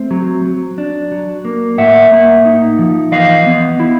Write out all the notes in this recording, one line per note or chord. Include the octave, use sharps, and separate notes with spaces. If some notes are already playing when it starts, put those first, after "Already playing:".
Already playing: A3 C4
F#3
F#3
D4
F#3
A#3
A2 E5 F#5
A#3
D#4
F3
E3 D#5 F5
B3
E4